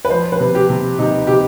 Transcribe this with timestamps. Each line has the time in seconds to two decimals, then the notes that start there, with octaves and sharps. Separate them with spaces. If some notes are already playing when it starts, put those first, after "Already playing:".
0.05 B4
0.10 F3 C5
0.32 B4
0.40 C3
0.55 G4
0.69 C3
0.99 C3 D#4
1.27 C3 G4